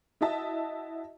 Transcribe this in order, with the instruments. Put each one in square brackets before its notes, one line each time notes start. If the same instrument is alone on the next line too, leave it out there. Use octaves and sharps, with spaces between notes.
[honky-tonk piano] E4 F#4 D#5 E5 A5